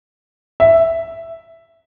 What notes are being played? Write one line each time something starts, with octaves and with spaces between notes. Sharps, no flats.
E5